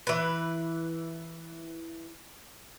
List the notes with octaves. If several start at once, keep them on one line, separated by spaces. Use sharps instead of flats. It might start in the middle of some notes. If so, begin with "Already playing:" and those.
E3 B4